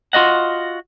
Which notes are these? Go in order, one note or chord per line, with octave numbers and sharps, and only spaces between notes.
F4 F#4 D#5 F#5